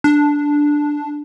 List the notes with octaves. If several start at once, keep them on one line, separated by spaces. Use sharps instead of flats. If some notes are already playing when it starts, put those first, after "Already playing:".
D4